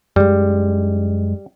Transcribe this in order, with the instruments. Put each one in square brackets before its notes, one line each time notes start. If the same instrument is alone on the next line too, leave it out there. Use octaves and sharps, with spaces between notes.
[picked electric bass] F#2 G#3 [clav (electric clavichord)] G3